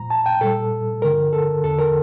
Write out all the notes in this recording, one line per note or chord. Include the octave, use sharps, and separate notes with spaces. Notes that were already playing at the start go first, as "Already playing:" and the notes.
Already playing: A#2 F3 A#5
A5
G5
A#2 G3 A4
G2 D3 F3 A#4
A4
E2 D3 F3 A4
A#4